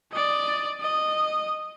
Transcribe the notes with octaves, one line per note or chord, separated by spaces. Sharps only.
D5 D#5
D#5